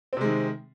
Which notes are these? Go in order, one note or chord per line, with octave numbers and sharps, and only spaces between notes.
C3 D#3 G#3 C4